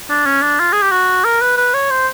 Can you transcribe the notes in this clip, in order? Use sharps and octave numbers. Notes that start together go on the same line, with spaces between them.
D4
C#4
D4
F4
G#4
G4
F#4
A#4
B4
B4
C#5
C5